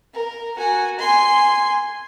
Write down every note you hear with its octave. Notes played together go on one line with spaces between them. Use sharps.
A#4
F#4 G#5
G#5 C6